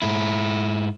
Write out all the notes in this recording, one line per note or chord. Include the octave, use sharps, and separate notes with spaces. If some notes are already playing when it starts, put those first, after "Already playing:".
G#2 E4